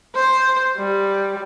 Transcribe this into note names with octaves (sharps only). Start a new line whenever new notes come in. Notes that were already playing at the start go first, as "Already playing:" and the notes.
C5
G3